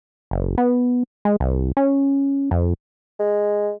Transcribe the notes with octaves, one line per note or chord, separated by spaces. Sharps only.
F#1
B3
G#3
C2
C#4
F2
G#3